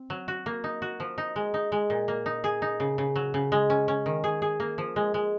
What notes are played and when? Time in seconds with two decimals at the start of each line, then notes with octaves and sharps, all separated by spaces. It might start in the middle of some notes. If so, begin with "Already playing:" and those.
Already playing: C4
0.10 F#3
0.28 F#4
0.46 A#3
0.64 D#4
0.82 F#4
1.00 F3
1.18 D#4
1.36 G#3
1.54 D#4
1.72 G#3
1.90 A#2
2.08 A#3
2.26 D#4
2.44 G#4
2.62 D#4
2.80 C#3
2.98 C#3
3.16 F#3
3.34 C#3
3.52 G#3
3.70 C#4
3.88 C#4
4.06 D#3
4.24 G#4
4.42 G#4
4.60 A#3
4.78 F3
4.96 G#3
5.14 G#3